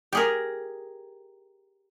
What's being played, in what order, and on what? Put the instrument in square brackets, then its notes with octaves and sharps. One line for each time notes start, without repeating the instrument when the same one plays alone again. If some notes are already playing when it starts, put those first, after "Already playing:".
[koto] G4 G#4 A#4